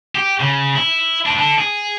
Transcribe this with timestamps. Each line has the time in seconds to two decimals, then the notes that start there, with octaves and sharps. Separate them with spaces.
0.15 G4
0.40 C#3
0.76 E4
1.26 D4 B4
1.38 D4 A4
1.59 G#4